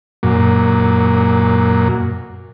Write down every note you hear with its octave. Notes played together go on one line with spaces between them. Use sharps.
F#2 A#2